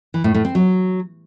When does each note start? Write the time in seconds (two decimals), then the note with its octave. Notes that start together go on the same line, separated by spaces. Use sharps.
0.14 E3
0.24 A2
0.34 A2
0.45 C4
0.55 F#3